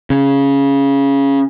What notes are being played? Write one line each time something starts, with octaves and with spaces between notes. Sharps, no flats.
C#3